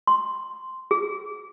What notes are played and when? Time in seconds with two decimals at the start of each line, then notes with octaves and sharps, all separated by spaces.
0.07 C6
0.91 G#4